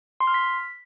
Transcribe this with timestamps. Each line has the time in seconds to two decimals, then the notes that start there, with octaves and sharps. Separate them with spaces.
0.20 C6
0.27 F6
0.34 B6